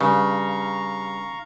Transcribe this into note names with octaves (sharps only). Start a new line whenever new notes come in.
G2 C#3 F5 A#5 C#6